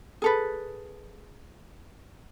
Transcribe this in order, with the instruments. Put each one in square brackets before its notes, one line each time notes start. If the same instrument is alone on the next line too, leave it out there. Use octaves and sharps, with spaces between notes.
[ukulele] G#4 A4 B4